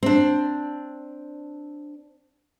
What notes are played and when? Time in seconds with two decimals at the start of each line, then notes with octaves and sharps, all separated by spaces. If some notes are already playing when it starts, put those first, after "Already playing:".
0.03 C4 D4